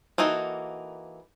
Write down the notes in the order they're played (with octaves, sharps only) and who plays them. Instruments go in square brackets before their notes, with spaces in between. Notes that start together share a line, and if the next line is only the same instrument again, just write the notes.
[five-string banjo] E3 A#3 D#4 F#4 A4